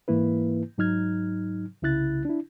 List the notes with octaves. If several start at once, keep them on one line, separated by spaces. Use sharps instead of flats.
G#2 E3 A#3 E4 B4
G#2 F#3 D#4 F6 G#6
C2 C#3 E4 F#6 A6
D4 E4